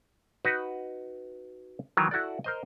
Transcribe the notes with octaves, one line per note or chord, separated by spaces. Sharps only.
D#4 F#4 B4
D#3 E3 F#3
E4 F#4 A4 D5
A#4 C5 D#5